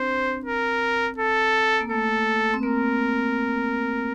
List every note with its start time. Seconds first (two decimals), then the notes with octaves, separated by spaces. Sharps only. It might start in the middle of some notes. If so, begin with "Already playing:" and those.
Already playing: C4 D4 C5
0.45 A#4
1.18 A4
1.81 A#3
1.90 A3 A4
2.54 C4
2.63 A#3 A#4